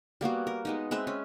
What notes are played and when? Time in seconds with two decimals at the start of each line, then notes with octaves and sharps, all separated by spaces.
0.21 G3 A#3 B3 F#4
0.47 A#4
0.65 G#3 B3 D#4
0.91 G#3 C4 B4 E5
1.07 C#4